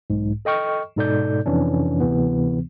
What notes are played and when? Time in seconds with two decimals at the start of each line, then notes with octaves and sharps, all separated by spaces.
0.10 B1 G#2
0.45 A4 D#5 G5 C#6 F6
0.96 G#2 B2 D#4 A4 D5 G6
1.46 F2 C3 E3 C#4 D4
2.00 D2 C3 E3 B3